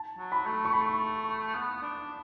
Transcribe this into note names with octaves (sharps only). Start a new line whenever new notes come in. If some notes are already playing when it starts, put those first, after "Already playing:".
Already playing: A5
F#3
B5
A3
C#6
A3 B5
B3
D4